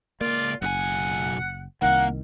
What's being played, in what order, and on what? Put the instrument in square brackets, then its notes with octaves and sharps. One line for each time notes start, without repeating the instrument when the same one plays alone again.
[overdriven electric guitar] C#2 D5 [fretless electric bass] A#3 [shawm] F4
[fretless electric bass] F#1 [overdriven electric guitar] B1 G#5 [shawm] F#5
[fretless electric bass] C2 D#3 [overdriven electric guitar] A#3 [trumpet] F#5